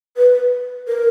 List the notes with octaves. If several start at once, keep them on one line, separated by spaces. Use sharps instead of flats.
B4
A#4